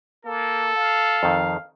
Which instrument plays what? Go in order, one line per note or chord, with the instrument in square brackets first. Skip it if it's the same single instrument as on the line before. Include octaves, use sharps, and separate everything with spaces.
[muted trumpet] A#3 [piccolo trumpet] A4
[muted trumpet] F5
[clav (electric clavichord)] F2 D#3